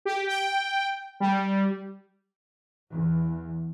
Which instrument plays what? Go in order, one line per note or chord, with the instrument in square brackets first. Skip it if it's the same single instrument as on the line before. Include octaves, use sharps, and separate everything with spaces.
[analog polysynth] G4
G5
G3
[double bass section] E2